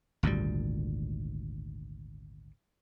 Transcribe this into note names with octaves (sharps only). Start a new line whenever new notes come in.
G#1 D2 A#2 G3